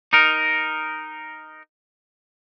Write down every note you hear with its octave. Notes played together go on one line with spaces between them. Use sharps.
D#4 A#4